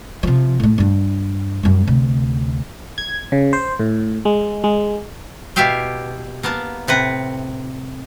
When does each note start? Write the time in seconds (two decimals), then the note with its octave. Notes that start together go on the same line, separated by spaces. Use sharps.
0.23 C3 F3
0.60 A2 A3
0.78 G2 D4
1.63 F#2 G3
1.87 D2 C3
2.98 G#6
3.32 C#3
3.53 C5
3.79 A2
4.25 G#3
4.64 G#3
5.56 B2 E4 G4 E5 F5 G5
6.43 A#3 B3 A#4 A5
6.87 A2 C3 B4 F#5